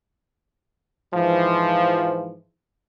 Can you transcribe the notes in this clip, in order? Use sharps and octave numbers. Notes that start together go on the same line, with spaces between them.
G#2 E3 F3